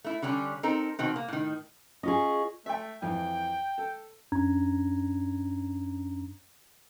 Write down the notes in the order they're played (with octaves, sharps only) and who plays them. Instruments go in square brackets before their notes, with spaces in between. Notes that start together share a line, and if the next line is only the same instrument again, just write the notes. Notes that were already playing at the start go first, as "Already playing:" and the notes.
[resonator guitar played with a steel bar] A3 E4
D3 G3 C#4 D4
C4 D#4 A4 A#4
B2 D#3 C4
A#3
A2 D#3
[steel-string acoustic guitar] C#4 F4 G#4 [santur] D#5 C#6
[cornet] A3 [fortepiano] E5 G5
[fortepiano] F2 E3 [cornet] G5
[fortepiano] A4
[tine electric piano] F#2 C#4 D4 A#5 G#6